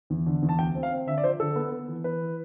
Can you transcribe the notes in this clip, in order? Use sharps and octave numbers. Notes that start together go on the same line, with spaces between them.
E2
D3
E2
A5
D2 G5
C4
F5
C4
D3 E5
D5
F3 C5
D3 A4
B3
B3
E3
E3 B4
E4